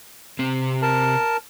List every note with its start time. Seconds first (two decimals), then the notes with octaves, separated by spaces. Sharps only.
0.39 C3 C4
0.82 A#4 A5